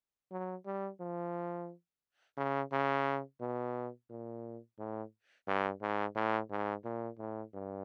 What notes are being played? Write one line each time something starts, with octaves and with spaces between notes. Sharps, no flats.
F#3
G3
F3
C#3
C#3
B2
A#2
A2
G2
G#2
A2
G#2
A#2
A2
G2